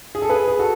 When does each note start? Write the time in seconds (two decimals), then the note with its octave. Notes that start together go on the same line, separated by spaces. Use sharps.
0.15 G#4
0.22 A4
0.29 G#4 B4
0.47 G#4
0.59 F#4 A4